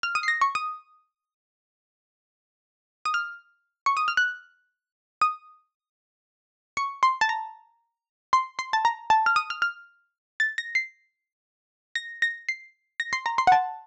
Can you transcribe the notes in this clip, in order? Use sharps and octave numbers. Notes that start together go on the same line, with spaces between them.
F6
D#6
C7
A#6
C#6
D#6
D#6
F6
C#6
D#6
F6
F#6
D#6
C#6
C6
A5
A#5
C6
C6
A5
A#5
A5
F6
D#6
F6
F6
A6
A#6
C7
A#6
A#6
C7
A#6
C6
A#5
C6
F#5
A5